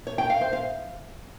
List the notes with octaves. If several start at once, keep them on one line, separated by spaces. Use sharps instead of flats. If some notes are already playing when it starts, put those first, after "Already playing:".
C#5
G5
F5
C5
F5